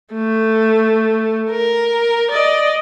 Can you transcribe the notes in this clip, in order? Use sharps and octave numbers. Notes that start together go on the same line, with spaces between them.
A3
A#4
D5 D#5